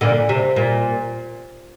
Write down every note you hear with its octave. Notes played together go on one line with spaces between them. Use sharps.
A#2 D3
C3
A#2